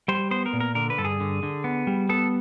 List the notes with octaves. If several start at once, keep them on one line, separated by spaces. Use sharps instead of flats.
G3 C5
B3 C5
A#4
A#2
A#4
D3 A#4
B4
G2 A4
G#4
D3
D3
B3
G3
B3 A4